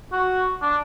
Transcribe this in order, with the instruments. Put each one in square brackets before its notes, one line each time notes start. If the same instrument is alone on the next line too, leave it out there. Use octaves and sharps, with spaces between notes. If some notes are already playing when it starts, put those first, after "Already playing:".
[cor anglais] F#4
D4